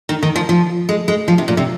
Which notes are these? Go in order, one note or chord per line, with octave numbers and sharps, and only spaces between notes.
D#3
D#3
F3
F3
G#3
G#3
F3
C3
A#2
C3